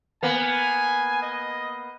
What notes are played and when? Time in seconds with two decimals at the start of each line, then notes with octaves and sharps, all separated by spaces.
0.23 A#3 B3 G#5
1.22 D#5